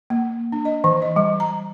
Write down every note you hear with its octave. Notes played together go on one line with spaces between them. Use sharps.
A#3
D4
D#5
E3
D#5
G3
A#5